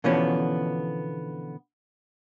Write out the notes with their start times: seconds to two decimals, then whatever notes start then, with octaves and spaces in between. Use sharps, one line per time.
0.04 B2 D3 E3 F3 B3 C#4